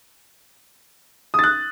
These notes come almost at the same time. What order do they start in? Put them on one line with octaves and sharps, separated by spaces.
D#6 A6 F#6